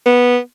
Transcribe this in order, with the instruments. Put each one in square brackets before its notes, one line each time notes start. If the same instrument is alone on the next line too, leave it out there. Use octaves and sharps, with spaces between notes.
[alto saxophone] B3